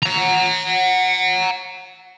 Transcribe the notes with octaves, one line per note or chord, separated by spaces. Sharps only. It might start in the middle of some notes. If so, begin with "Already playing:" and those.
F#5 A#5